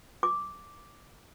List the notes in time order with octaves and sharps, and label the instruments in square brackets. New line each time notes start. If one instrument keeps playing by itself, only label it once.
[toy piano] D6